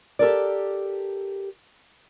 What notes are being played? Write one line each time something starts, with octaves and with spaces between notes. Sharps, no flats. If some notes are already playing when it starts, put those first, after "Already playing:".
G4 A4 A#4 D5